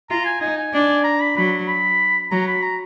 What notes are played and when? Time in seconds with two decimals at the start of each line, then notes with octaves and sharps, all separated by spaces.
0.10 F4 A#5
0.25 G#5
0.41 D#4 G#5
0.57 G#5
0.73 D4
1.04 A#5
1.20 B5
1.36 F#3 B5
1.68 B5
2.31 F#3 A#5
2.48 B5
2.62 A#5